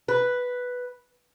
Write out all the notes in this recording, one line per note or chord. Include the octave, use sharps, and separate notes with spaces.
B4